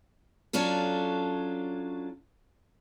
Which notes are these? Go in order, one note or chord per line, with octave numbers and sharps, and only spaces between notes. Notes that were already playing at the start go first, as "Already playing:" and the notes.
F#3 C#4 D4 F4 A4